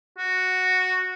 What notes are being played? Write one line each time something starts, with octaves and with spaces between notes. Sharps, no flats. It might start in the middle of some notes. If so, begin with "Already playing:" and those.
F#4